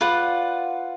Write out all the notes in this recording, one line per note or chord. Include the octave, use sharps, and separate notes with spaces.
F4 B4 D5 F#5